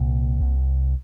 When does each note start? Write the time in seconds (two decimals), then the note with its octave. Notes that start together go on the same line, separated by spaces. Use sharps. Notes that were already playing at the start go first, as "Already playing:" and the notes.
Already playing: C2 A#2 A#3
0.39 C2 C3